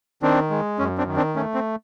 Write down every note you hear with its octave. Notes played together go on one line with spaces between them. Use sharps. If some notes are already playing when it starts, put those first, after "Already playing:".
D#3 C4 D4
G#3
F#2 C#4
C4 D4
D#3
C4 D4
A3 C#4
C4